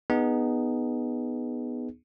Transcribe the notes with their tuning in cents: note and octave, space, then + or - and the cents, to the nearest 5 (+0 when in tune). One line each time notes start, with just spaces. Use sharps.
B3 +0 D#4 -15 G#4 +0